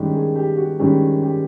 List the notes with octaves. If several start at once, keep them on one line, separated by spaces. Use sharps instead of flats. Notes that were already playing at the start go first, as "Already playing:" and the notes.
Already playing: G2 D#3 G#3 C#4 G4
G#4
G4
F#4
G2 D#3 G#3 C#4 G4
G4